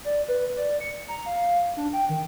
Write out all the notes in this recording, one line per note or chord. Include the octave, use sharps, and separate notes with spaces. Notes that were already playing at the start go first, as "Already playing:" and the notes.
D5
B4
D5
C#7
A#5
F5
D4
G5
D#3